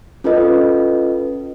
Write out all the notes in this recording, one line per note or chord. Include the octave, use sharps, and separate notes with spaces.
C#4 F4 A4 B4 D#5